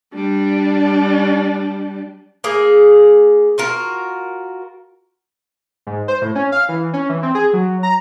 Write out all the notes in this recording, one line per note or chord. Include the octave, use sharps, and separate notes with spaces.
G3 D4
A#3 G#4
F4 F#4 A#4
G#2
C5
A2
C#4
F5
E3
C#4
E3
C4
G#4
F#3
A#5